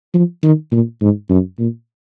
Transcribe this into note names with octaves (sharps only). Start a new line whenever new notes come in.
F3
D#3
A#2
G#2
F#2
A#2